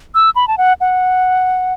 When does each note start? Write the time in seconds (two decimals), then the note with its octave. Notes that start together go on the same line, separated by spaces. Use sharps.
0.15 E6
0.36 B5
0.48 A5
0.58 F#5
0.81 F#5